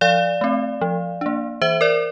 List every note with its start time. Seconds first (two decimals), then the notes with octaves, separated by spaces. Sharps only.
0.01 F3 D5 F5
0.41 A3 C4
0.81 F3
1.21 A#3 D4
1.62 E3 C5 E5
1.81 A#4 D5